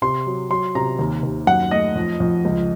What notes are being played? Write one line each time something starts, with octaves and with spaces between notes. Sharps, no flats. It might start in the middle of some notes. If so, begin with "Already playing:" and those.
C3 C6
F#3
F#3 C6
C3 A#5
D#2
D#2
F#2 F#5
A3 D#5
F2
F2
C#2